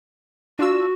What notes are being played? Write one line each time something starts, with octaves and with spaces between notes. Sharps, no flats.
D4 F4 F#4 E6